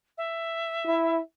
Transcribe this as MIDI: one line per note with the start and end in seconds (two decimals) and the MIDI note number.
0.18 1.20 76
0.86 1.19 64